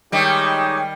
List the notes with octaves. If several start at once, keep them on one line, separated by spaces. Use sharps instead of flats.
D#3 G3 G#3 D#4 G4 C#5